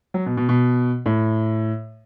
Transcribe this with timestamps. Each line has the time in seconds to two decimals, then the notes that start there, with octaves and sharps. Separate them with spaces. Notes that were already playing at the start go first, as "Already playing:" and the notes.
0.14 F#3
0.26 B2
0.37 B2
0.49 B2
1.06 A2